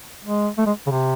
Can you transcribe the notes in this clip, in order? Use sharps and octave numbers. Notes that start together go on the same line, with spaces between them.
G#3
A3
G#3
C#3
C3